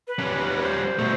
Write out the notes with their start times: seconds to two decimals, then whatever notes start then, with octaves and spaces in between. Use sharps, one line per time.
0.08 B4
0.19 G3 C#4
0.63 C5
0.99 B2 A3